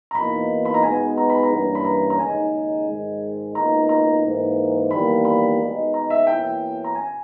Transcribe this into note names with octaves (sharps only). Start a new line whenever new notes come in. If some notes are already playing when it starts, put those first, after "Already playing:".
A#5
E2 B2 A#3 D#4 B5
B5
A#5
B2 G#3 B3 D#4 G#5
A#5
B5
A#5
G2 E3 A#3 C#4
B5
A#5
A#5
D#2 C#3 G#3 D#4 G#5
G#2 D#3 G#3
C#2 B2 A#3 D#4 A#5
A#5
G#2 E3 A#3
E2 D#3 G3 A#3 B5
B5
B2 G#3 D#4
A#5
E5
E2 B2 A#3 C#4 E4 G5
A#5
G#5